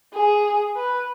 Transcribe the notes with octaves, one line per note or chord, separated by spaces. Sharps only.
G#4
B4